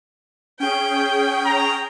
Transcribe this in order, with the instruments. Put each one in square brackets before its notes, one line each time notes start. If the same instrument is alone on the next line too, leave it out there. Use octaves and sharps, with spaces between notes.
[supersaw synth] C#4 G#4 [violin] G5
[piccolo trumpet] A#5